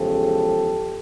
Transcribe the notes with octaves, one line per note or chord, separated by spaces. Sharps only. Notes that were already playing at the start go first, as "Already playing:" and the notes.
Already playing: E2 C#3 F3 G#3 G4 A4